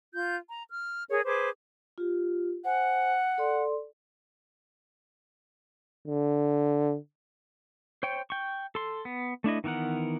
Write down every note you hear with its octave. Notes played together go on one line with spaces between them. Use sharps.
F4 G6
A#5
F6
G#4 A#4 C#5
G#4 B4 C5 D6
F4 G4
C5 F#5 G#5
A4 D5 C6
D3
C5 C#5 G5
G5 C#6
A4 C6
B3
A3 D4 E4 D#5
D#3 E3 B3 A#4 F#5